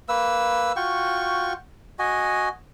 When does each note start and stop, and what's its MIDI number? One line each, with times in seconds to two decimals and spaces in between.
0.09 0.72 58
0.09 0.72 71
0.09 0.72 88
0.76 1.53 65
0.76 1.53 66
0.76 1.53 79
0.76 1.53 85
1.99 2.49 66
1.99 2.49 75
1.99 2.49 80